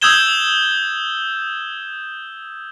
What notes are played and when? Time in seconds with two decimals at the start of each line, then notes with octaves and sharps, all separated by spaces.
0.02 D#6 E6 G6 G#6 E7 G7